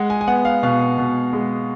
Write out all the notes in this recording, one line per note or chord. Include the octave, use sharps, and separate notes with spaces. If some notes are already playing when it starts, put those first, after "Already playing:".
Already playing: G#3 F#5
G#5
G#5
B3 F#5
F5
B2 F5
B2
G#3